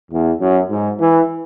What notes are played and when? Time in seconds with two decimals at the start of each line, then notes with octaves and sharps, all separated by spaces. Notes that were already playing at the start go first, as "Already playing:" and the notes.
0.12 E2
0.41 F#2
0.70 G#2
1.00 E3